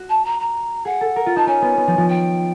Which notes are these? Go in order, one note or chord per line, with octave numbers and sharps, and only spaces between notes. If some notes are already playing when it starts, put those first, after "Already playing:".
Already playing: F#4
A5
A#5
A#5
G#4 F#5
A4
A#4
F4
D#4 A5
C#4 G#5
B3
B3
F3
F3
G5